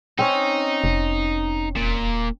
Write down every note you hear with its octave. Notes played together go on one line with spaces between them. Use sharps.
C4 C#4 D#4
F1
D#1 A#2